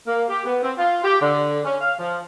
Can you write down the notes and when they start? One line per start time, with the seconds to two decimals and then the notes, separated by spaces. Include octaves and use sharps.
0.07 A#3
0.29 G4
0.45 B3
0.63 C4
0.78 F4
1.04 G4
1.21 D3
1.65 C#4
1.80 F5
1.99 F3